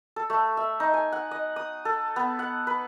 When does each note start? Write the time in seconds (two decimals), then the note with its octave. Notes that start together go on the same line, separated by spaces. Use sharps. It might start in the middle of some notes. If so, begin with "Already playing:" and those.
0.16 A4
0.30 A3
0.57 E5
0.80 D#4
0.94 G#5
1.12 F#5
1.31 D#5
1.56 D#6
1.85 A4
2.16 B3
2.39 F#5
2.67 B4